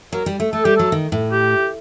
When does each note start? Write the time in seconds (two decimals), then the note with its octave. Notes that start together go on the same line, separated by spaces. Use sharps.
0.12 F#3 A#4
0.26 G3
0.40 A3
0.53 A3 A4
0.65 G3 G4
0.76 F#3 A4
0.92 D#3
1.12 A2
1.32 G4